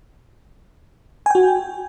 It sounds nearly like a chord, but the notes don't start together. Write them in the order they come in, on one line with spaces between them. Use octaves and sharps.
G#5 G5 F#4